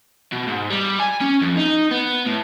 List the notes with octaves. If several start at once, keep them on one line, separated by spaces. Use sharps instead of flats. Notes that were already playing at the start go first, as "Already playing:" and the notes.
B2
G#2
G3
G#5
C#4
F2
D#4
B3
A2